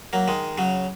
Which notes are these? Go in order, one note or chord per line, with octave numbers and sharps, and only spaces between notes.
F#3 A#3
D#3 G#3
C#3 F#3